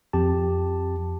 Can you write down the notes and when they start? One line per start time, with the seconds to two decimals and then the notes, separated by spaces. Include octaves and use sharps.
0.13 F2 G4 A5